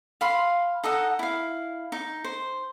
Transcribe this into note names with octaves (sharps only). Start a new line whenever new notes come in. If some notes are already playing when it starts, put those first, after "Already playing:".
F5 B5 C6
D#4 A4 D#5 F#5
E4 F5
D#4
C5